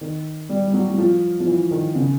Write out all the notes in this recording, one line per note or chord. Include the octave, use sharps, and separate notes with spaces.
D#3
G3
G3
F#3
F#3
F3
F3
E3
D#3
C#3